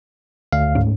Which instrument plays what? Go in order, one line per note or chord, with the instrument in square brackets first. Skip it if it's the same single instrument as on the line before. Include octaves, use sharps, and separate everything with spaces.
[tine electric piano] D2 F5
[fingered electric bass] G#2 A3 C#4